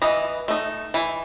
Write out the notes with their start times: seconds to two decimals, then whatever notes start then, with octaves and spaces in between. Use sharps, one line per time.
0.02 E3 D#5
0.48 A3 D#4
0.94 E3